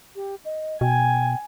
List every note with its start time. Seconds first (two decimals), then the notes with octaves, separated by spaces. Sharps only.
0.16 G4
0.45 D#5
0.81 B2 G5 G#5